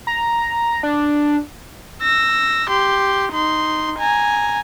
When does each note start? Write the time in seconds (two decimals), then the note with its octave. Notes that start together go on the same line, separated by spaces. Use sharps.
0.07 A#5
0.83 D4
2.03 E6 A#6
2.69 G4 C6
3.33 D#4 C6
3.99 G#5 A#5